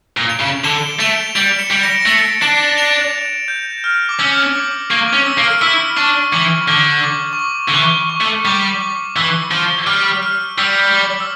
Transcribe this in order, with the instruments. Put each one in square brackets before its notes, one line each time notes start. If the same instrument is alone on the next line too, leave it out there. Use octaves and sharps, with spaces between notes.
[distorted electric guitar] A#2
[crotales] D7 F7
[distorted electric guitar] C#3
[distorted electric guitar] D3 [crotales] E7 G7
[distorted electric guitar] A3 [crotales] D7 F7
[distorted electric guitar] G3 [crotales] D7 F7
[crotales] F7
C#7 E7
[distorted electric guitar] G3
[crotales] A#6 D7
A#6
[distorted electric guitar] A3 [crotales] A6 C#7
[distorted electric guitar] D4 [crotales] C#7 E7
[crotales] D7 F7
G6
F6
D6
[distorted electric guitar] C#4 [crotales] E6
[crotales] D6
[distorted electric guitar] A#3 [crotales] C#6
[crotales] D6
[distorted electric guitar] C#4
[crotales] E6
[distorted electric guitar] A#3
[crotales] F6
[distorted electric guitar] E4 [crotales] E6
[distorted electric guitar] D4 [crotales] C#6
[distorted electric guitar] E3 [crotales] D6
[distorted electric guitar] D3 [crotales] D6
[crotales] D6
C#6
D6
[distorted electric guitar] D3
[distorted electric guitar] E3 [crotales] C#6
[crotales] C#6
[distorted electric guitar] A3
[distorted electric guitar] G3 [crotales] D6
[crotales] D6
[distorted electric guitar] E3 [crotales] E6
[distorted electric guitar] F3 [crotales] G6
[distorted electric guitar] G3 [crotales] F6
[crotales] F6
[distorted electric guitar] G3 [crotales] E6
[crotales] D6
E6